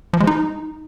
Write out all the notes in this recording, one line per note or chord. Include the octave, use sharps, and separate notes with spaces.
F3
G#3
D#4